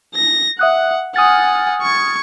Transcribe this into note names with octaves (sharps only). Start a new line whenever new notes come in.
A#6
E5 F#5 D#6 F#6
F#5 G#5 D#6 F6 A6
C#6 G#6